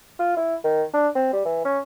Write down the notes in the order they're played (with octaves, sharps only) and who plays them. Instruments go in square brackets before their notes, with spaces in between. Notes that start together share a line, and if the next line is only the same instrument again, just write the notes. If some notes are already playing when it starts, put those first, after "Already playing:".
[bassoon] F4
E4
D#3
D4
C4
G3
E3
C#4